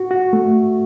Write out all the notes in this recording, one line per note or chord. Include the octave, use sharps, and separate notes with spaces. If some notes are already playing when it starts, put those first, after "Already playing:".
Already playing: F#4
F#4
A3